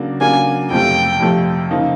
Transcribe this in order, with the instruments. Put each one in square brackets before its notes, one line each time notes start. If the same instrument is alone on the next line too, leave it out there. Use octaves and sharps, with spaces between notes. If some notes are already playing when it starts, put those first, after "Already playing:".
Already playing: [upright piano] C#3 F#3 A#3 D4
[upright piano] C#3 F#3 A#3 D4 [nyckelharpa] G#5
[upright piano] F2 C3 F3 A3 [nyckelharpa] G5
[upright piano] F2 C3 F3 A3
C#3 F3 A#3 D#4